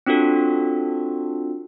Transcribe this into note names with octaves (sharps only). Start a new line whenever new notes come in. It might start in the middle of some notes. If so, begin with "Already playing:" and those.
C4 D4 F4 F#4 A4